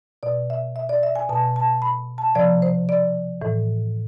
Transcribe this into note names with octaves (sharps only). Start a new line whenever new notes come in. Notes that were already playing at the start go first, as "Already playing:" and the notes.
B2 D5
E5
E5
D5
E5
G#5
B2 A5
A5
B5
A5
C3 F3 D5
C5
D5
A2 E3